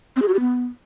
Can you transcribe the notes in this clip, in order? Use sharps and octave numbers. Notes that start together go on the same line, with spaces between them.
C4
G#4
F#4
G4
B3